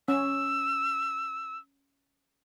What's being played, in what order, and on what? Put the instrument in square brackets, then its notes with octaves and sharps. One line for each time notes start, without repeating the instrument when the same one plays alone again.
[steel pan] C#4 [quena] E6